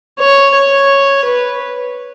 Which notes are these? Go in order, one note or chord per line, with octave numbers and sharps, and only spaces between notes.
C#5
C#5
B4